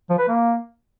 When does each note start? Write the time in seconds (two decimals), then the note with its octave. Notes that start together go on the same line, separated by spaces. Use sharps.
0.10 F3
0.19 B4
0.28 A#3